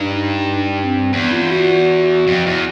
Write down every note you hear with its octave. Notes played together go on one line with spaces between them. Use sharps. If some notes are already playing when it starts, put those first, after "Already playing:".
Already playing: G2 D#4
D4
C4
E2 B3
F4
F#4
F2
E2